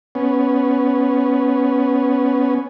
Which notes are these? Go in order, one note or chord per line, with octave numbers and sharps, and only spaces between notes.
B3 C#4